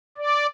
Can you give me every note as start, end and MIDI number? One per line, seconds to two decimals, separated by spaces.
0.18 0.47 74